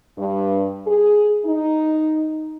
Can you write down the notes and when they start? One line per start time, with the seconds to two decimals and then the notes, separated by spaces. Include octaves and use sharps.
0.18 G2
0.86 G#4
1.46 D#4